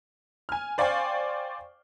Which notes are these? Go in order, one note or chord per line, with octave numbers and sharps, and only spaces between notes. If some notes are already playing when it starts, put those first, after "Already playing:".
G#5 F6
C5 D5 F5 G5 G#5 C#6